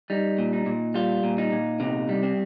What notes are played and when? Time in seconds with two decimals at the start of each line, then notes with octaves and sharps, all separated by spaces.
0.10 G3 D#4
0.39 A#2
0.53 D#4
0.66 A#2
0.94 G3 F4
1.24 A#2
1.38 D#4
1.52 A#2
1.80 C3 D#4
2.09 G3
2.23 C4